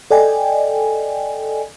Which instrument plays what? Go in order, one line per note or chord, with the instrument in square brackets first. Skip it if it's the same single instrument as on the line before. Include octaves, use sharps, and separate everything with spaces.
[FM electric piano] A4 D5 D#5 G5 G#5